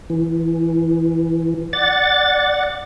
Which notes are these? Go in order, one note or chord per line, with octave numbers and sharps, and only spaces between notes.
E3
D5 F#5 A6